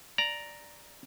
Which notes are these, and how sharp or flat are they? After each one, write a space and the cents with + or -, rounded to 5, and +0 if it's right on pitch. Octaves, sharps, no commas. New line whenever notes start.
D5 +0 A#5 +0